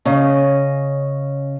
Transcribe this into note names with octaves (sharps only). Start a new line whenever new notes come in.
C#3 C#4 D#5